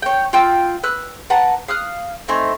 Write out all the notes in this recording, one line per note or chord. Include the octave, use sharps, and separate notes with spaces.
C#5 G5
F4 G5 E6
B4 E6 F#6
B4 F#5 A5 A#5
F5 D#6 F6 F#6
A3 C4 D#4 G#5